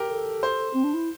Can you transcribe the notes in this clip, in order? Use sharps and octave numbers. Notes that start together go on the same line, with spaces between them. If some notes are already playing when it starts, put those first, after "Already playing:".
Already playing: G4 A#4
A4
C5
C4
D4
E4